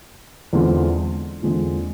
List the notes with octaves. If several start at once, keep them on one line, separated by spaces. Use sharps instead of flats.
E2 D3 G#3 C4 F4
E2 D3 G#3 C4 F4